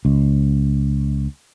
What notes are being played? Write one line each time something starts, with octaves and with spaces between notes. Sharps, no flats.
C#2